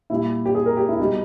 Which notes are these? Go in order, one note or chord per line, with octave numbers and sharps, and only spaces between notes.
A#2 G3 E4
G4
G#4
A#4
G4
E4
B2 G3 D#4